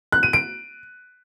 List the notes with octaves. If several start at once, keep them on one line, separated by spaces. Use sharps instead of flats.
F#6
D#7
D7